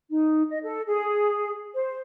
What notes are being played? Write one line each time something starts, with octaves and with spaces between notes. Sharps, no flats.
D#4
D#5
A4
G#4
C5